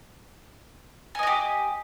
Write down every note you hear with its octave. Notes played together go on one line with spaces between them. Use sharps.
F#4 G4 D#5 G#5